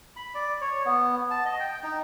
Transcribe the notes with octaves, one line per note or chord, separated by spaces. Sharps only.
B5
D5
C#5
B3
A5
D#5
G5
D#4